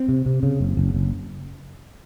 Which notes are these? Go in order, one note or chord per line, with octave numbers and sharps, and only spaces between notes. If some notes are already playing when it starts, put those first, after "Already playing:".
Already playing: C4
C3
C3
C#3
F#1
F#1
F#1